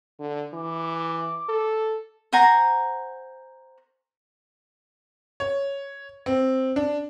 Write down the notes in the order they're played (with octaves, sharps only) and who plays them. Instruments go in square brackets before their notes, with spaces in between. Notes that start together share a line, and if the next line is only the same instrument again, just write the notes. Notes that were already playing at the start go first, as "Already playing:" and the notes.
[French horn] D3
[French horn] E3 [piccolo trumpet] D6
[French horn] A4
[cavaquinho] C5 F#5 G#5 A#5
[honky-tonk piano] C#5
C4
D4